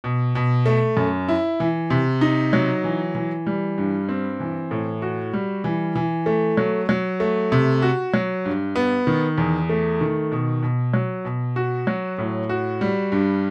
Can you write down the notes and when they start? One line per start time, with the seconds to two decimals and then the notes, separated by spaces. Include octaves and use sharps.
0.04 B2
0.35 B2
0.66 A3
0.97 F#2
1.29 E4
1.60 E3
1.90 C3
2.21 D#4
2.53 F#3
2.84 E3
3.15 E3
3.47 G3
3.78 G2
4.09 C4
4.40 E3
4.71 A2
5.02 F#4
5.33 G3
5.64 E3
5.95 E3
6.26 A3
6.57 F#3
6.89 F#3
7.20 A3
7.52 C3
7.82 F#4
8.14 F#3
8.45 G2
8.76 B3
9.07 D#3
9.38 E2
9.69 A3
10.01 D#3
10.32 B2
10.62 B2
10.94 F#3
11.25 B2
11.56 F#4
11.87 F#3
12.18 A2
12.49 F#4
12.81 G3
13.12 G2